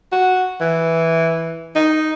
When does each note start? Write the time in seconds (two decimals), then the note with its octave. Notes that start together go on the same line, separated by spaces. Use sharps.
0.12 F#4
0.61 E3
1.75 D#4